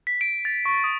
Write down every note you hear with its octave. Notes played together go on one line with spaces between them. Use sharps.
B6
D7
A6
C#6
D#6